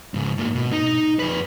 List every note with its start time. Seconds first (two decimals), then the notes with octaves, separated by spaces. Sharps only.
0.14 C#2 G#2
0.38 G#2 A#3
0.55 B2
0.72 D#4
1.19 F2 B4